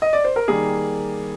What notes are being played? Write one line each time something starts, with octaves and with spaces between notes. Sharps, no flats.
D#5
D5
C5
A#4
D#3 G3 A#3 G#4